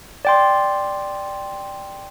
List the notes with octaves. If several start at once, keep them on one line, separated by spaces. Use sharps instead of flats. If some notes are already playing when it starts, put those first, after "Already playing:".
D5 G5 C6